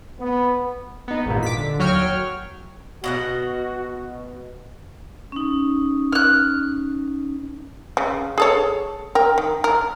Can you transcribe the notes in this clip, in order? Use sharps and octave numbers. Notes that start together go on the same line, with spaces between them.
B3
B3 D#4
G#1 E2 G2 A#2
D6 B6
D3
D#2 F#3 C#5 G5 F6
B2 F#4 D#5 F#5
C#4 D#4
F6 F#6
C#3
G#4 A4 C#5
A#4 G5
D#3
A#4